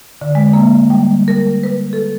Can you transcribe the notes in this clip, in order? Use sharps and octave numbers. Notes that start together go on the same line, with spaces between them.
D3
G#3
A#3
G3
A#4
B4
A4